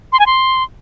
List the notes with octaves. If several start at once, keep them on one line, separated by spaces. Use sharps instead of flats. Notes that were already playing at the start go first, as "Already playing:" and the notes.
C6
G#5
C6